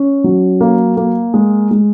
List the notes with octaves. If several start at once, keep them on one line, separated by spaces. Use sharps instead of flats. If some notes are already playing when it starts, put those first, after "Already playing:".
Already playing: C#4
F#3
A#3
A#3
G#3
G#3